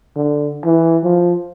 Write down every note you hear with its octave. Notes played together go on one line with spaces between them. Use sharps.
D3
E3
F3